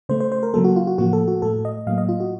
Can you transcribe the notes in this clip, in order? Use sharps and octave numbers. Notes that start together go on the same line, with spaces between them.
C#3 A3 C5
C5
C5
A#4
C#3 F#3 A#3 A4
F#4
F4
F#4
A2 F3 A#3 F#4
A4
F#4
A2 A3 A4
D#5
A2 F#3 A#3 F5
D#5
F4
F#4